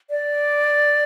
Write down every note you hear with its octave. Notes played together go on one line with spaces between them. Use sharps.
D5